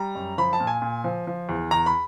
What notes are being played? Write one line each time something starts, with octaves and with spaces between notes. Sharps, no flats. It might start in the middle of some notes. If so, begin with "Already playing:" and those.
Already playing: G3 A#5
F#2
F3 B5
A5
A#2
G#5
A#2
F3
F3
E2
E2 A#5
B5